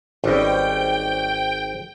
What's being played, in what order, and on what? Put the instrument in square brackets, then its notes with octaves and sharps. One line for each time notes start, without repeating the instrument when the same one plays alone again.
[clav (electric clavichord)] G#1 B4 D#5 [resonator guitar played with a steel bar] G3 C#4 [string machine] G5